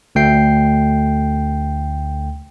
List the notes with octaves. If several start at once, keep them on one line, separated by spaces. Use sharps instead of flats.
D2 A3 G5 C7